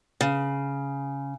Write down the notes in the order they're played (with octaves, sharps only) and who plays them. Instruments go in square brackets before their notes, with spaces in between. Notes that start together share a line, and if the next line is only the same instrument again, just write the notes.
[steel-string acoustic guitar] C#3